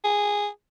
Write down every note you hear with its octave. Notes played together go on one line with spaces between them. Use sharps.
G#4